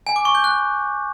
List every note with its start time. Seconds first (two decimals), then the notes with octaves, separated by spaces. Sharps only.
0.07 G#5
0.16 D6
0.25 C#6
0.35 G6
0.44 F#6